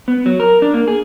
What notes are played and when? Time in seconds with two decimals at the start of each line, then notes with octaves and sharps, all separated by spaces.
0.08 B3
0.26 F#3
0.40 A#4
0.62 D4
0.74 A#3
0.88 G#4